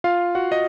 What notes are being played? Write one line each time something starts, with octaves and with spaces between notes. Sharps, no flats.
F4 F5
F#4 F#5
D#5 D#6